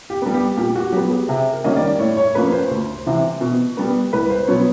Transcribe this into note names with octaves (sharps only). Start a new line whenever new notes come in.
G4
G3 B3
G4
A#2 G4
F#4
F#3 B3 G4
G#4
C3
A#4
D#3 G3 A#3 C#4 D#5
D5
A2 C#5
C#5
F3 A#3 C#4 B4
C5
D2
C3 E3
B2
G3 B3
C2 B4
C5
B2 F#3 B3 C#5